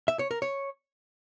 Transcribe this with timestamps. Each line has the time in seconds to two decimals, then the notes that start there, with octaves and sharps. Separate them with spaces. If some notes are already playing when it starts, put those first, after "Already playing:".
0.08 E5
0.19 C#5
0.31 A#4
0.42 C#5